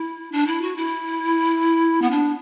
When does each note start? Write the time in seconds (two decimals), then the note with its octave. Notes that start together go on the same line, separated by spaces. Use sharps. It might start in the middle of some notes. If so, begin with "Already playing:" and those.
Already playing: E4
0.32 D4
0.47 E4
0.62 F#4
0.76 E4
2.02 B3
2.11 D4